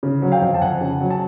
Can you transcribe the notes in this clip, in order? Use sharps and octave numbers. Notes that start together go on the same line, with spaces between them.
C#3
F#3
F5 G5
F2
A5
F2 F#5 G#5
C#3
F#3
A5